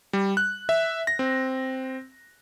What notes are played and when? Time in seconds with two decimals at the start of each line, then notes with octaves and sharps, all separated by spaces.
0.13 G3
0.37 F#6
0.69 E5
1.07 A#6
1.19 C4